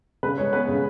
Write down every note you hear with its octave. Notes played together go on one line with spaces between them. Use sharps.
C#3 B4
G#3 C#5
B3 B4
C#3